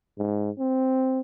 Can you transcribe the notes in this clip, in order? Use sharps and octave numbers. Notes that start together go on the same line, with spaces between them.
G#2
C4